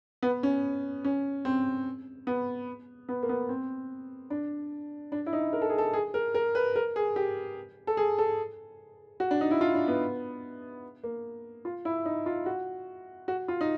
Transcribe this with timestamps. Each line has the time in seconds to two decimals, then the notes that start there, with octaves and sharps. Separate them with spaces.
0.23 B3
0.43 C#4
1.05 C#4
1.45 C4
2.27 B3
3.09 B3
3.23 A#3
3.29 B3
3.49 C4
4.30 D4
5.12 D4
5.26 E4
5.33 D#4
5.53 A#4
5.62 A4
5.70 G#4
5.78 A4
5.93 G#4
6.14 A#4
6.35 A#4
6.55 B4
6.76 A#4
6.96 G#4
7.16 G4
7.87 A4
7.97 G#4
8.18 A4
9.20 F#4
9.31 D4
9.41 D#4
9.51 E4
9.61 F4
9.74 D4
9.88 B3
11.04 A#3
11.65 F4
11.85 E4
12.05 D#4
12.26 F4
12.46 F#4
13.28 F#4
13.48 F4
13.61 D#4